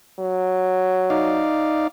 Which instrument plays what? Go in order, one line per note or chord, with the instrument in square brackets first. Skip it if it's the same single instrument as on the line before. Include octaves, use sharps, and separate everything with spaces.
[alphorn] F#3
[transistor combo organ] D#4 D5 F5